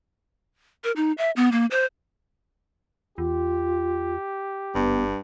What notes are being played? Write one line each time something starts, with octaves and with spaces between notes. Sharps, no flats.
A#4
D#4
E5
B3
A#3
C5
E2 F4 G4
F#1 G2 B3